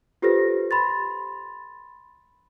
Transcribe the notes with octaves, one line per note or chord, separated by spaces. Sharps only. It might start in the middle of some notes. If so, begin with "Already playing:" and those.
F4 G4 A4 B4 C5 A#6
B5 C6 A6